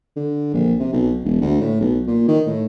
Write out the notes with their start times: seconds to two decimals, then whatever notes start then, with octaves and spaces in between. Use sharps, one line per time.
0.16 D3
0.54 A#1
0.79 C3
0.93 B1
1.24 E1
1.42 D2
1.61 A2
1.80 B1
2.07 A#2
2.28 D#3
2.47 A2